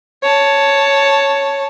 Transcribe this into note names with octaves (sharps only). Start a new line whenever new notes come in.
C#5 A5